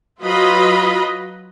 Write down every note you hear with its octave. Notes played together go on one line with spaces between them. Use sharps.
F#3 F4 B4 D#5 B5